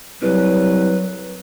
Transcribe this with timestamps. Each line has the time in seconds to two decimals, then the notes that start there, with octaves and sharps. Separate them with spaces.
0.22 C2 F#3 B4